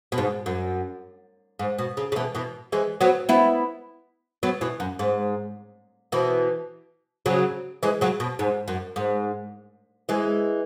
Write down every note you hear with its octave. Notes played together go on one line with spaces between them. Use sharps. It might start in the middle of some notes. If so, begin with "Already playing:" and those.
B2
G#2
F#2
G#2
B2
C#3
C#3
B2 E3
B2 E3
E3 G#3
F#3 B3
B3 E4
F#3 B3
B2 E3
F#2
G#2
B2 E3
C#3 F#3
E3 G#3
C#3 F#3
B2
G#2
F#2
G#2
E3 G#3